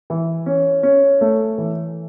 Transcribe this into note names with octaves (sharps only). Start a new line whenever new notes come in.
E3
C#4
C#4
A3
E3